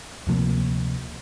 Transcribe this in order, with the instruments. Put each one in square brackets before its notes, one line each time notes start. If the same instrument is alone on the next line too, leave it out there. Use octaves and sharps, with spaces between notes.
[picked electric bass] D2 C3 F3 A#3